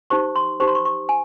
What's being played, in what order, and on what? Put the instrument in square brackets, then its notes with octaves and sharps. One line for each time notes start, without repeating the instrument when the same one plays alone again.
[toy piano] D#4 G4 C5 C#6
C6
D#4 G4 C5 C#6
C6
C#6
C#6
G#5